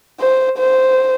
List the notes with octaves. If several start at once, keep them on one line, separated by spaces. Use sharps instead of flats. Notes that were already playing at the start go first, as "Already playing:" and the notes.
C5
C5